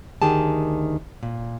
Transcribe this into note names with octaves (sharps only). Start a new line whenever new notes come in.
D2 D#3 G4 G#4 A5
A#2